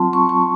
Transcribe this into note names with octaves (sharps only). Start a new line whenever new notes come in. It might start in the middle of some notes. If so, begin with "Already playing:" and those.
Already playing: F#3 C4 F4 A5 C6
C#6
C#6